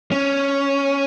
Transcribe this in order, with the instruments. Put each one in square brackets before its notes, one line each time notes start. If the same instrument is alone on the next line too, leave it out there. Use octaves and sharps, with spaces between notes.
[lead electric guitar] C#4